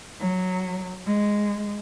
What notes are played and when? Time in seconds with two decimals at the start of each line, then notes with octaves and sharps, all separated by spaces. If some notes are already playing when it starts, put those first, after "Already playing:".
0.20 F#3
1.07 G#3